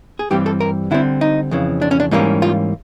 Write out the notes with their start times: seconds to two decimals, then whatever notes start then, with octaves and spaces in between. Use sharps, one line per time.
0.19 G#4
0.31 G2 E3 G3 C4 G4
0.46 A4
0.60 A#4
0.91 D3 G3 C4 E4
1.21 D#4
1.51 F2 C#3 E3
1.82 D4
1.91 C#4
2.00 D4
2.11 G#2 E3 G3 A#3 C#4 D#4
2.42 F4